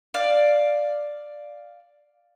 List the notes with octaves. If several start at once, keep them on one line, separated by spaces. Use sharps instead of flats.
D5 F5